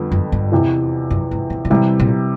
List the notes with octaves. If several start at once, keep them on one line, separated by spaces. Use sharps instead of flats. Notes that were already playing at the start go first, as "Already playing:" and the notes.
Already playing: F2 D3 G3 B3
F#2
G2
E2 C3 E3
F#2
G#2
A2
A#2
A2 C3 E3 G3 C4
A#2